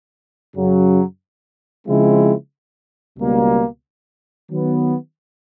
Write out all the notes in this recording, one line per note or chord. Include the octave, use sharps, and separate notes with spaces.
F#2 C#3 F#3
C#3 F3 G#3 C4 E4
C#2 B2 G3 A#3
D#3 F#3 B3